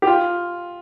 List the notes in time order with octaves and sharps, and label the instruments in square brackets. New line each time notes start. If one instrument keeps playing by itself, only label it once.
[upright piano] G4
F4